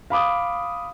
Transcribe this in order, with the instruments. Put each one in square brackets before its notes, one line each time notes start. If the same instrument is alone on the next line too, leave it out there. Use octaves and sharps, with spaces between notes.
[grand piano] F5 B5 D6 D#6